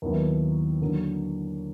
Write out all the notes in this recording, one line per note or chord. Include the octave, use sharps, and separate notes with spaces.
D#2 D#3 F#3 B3 E4
D3 F#3 A#3